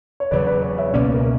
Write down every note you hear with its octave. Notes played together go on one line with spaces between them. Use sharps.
C#5
E2 C#3 F#3 B4 D5
B4 D5
B4 D5
C#5 E5
C#2 B2 A#3 C#4 B4 D5
A#4